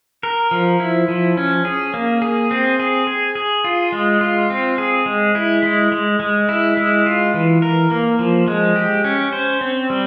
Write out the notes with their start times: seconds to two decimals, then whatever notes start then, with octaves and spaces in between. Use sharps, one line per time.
0.23 A#4
0.51 F3
0.80 E4
1.08 F3
1.37 C#4
1.65 G#4
1.94 A#3
2.22 G#4
2.51 C4
2.80 G#4
3.07 G#4
3.35 G#4
3.64 F4
3.92 G#3
4.21 F4
4.50 C4
4.78 G#4
5.06 G#3
5.35 E4
5.63 G#3
5.92 G#3
6.20 G#3
6.49 E4
6.77 G#3
7.06 F4
7.34 E3
7.62 A#4
7.91 A#3
8.19 F3
8.48 G#3
8.76 G4
9.04 C#4
9.33 C5
9.61 C4
9.90 G3